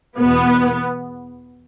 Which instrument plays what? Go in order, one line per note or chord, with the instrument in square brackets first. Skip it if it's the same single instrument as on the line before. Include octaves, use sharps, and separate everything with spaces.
[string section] E2 B2 B3